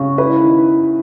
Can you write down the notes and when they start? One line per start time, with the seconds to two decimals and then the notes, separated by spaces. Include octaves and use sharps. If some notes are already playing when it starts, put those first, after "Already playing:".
Already playing: C#3 F#4
0.18 E4 B4
0.43 D#3